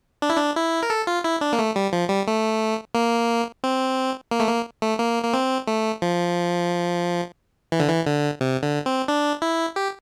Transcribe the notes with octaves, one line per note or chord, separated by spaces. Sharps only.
D4
E4
D4
E4
A#4
A4
F4
E4
D4
A#3
A3
G3
F3
G3
A3
A#3
C4
A#3
A3
A#3
A3
A#3
A#3
C4
A3
F3
E3
D3
E3
D3
C3
D3
C4
D4
E4
G4